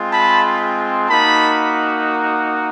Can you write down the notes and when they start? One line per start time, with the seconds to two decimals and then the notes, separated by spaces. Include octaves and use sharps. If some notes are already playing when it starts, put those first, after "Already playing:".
Already playing: G#3 C4 F4
0.11 A5 B5
1.08 A#3 D#4 F#4 A5 B5